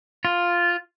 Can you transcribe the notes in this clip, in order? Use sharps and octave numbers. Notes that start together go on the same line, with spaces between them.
F4